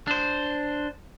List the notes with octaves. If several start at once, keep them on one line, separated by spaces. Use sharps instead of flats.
D4 C5